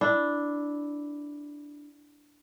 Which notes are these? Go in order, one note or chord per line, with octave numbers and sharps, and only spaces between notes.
D4 E4